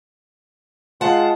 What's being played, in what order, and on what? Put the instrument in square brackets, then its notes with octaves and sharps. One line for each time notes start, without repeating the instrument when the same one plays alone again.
[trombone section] G#3 F4 [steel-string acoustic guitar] F#5 A5